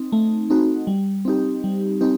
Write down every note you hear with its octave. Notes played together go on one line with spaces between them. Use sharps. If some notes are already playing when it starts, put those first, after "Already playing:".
Already playing: C4 D#4
A3
C4 D#4 F#4
G3
C4 D#4 G4
G3
C4 D#4 G4